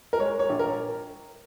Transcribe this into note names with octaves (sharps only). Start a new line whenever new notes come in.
A#4
G#3 C#5
C#5
A#1
A#4